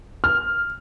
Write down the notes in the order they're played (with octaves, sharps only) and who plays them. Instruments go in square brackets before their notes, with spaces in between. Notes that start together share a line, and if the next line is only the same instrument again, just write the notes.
[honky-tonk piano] F6